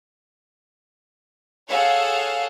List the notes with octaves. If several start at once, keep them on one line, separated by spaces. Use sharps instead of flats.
G#4 A4 C#5 F5 F#5